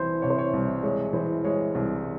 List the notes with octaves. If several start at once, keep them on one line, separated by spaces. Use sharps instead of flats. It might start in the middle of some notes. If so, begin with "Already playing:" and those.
Already playing: C2 E3 C5
C3 C#5
C5
C#5
C2
G#3 C#5
E3 C5
G#3 C#5
C2